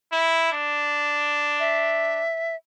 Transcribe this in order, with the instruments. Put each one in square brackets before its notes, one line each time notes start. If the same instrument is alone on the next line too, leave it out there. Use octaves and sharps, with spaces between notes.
[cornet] E4
D4
[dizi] E5